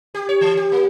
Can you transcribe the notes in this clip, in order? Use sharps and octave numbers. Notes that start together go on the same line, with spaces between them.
G4
C#5
E3
G4
A#3